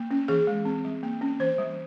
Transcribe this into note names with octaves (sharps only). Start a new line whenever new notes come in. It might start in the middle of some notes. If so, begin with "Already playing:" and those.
Already playing: A#3
C#4
E3 G#4
G#3
C4
G3
A#3
C#4
E3 C5
G3